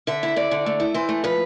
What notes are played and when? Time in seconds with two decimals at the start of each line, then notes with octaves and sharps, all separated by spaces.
0.07 D3 E5
0.23 E4
0.36 D3 D5
0.51 D3
0.66 A3
0.80 E4
0.94 E3 C5
1.09 A3
1.24 F3 B4